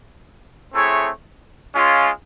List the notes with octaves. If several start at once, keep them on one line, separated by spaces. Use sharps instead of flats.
A3 C4 E4 G#4 C#5
G#3 C#4 F4